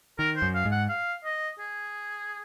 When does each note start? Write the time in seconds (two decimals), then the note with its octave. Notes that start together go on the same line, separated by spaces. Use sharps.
0.19 D#3 A#4
0.36 C5
0.42 F#2
0.54 F5
0.65 G#2
0.72 F#5
0.89 F5
1.24 D#5
1.59 G#4